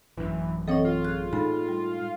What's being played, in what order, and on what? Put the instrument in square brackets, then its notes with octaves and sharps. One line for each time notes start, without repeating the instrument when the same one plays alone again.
[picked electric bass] A1 F#2 [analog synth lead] E3
[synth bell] E3 C4 C#6 [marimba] A4 C#5 [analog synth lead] D#5
[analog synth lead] F4
[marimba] G#4 F#6
[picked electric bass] A2 G#3 [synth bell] D#4 [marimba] A4 B5
[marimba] G3